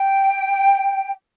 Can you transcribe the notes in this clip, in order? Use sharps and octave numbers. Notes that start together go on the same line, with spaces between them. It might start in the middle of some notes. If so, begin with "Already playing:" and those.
Already playing: G5